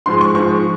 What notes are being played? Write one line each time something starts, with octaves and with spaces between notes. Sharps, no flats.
G#2 F3 G#3 C6
C#6
G#2 F3 G#3 C#6